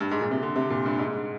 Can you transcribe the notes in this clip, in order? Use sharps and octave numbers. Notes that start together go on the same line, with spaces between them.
G2
G#2
A#2
C3
D3
C3
A#2
G2
G#2